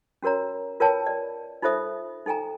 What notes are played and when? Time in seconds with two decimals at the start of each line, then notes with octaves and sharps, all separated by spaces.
0.22 C#4 F#4 A#4 C#5 A#5
0.80 F4 A#4 B4 C#5 G5 A5
1.07 D5
1.62 D#4 F4 A4 C5 E5 D#6
2.26 D#4 A4 G5 G#5 A#5